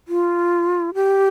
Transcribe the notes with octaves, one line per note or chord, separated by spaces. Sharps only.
F4
G4